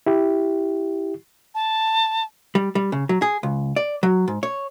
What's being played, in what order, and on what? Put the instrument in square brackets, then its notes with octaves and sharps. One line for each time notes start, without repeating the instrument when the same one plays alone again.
[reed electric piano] E4 G4
[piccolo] A5
[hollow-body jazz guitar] G3
G3
C#3
F#3
G#4
C#2
D5
F#3
G#2
C#5